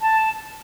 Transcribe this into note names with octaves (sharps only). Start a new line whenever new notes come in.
A5